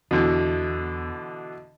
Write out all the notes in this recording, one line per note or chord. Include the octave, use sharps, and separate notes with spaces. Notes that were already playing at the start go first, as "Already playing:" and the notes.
E2 B2 D3 E3